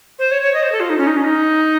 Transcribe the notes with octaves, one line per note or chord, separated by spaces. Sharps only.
C5
C#5
C#5
D#5
C5
A4
F4
D#4
C#4
D#4
C#4
D#4